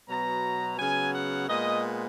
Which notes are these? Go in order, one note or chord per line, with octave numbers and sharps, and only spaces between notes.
B2 F#3 B3 A#5
C#3 F#3 B3 G#5
F#5
A#2 G#3 B3 D#5